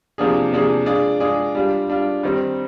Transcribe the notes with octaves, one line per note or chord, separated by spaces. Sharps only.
C3 F3 A#3 D4 G#4
C3 F3 A#3 D4 G#4
G#3 D4 F4 G#4 D5
G#3 D4 F4 G#4 D5
G3 D4 F4
G3 D4 F4
D#3 G3 C4